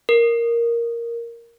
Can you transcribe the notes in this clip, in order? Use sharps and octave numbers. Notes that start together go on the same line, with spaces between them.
A#4